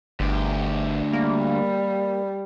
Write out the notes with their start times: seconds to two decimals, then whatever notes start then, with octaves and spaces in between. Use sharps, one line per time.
0.20 G1 D2 G4
1.13 G3 A#3